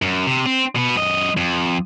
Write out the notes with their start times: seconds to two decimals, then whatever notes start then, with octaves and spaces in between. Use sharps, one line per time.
0.02 F#2
0.27 C3
0.46 C4
0.76 B2 B3
0.96 F#2 D#5
1.37 F2